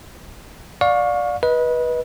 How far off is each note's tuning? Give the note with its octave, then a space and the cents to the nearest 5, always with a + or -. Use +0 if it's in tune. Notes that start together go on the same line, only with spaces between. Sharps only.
D5 +0 F5 +30 C#6 +0
B4 -20 D#5 +20